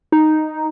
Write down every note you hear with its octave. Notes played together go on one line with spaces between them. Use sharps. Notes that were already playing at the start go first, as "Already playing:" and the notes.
D#4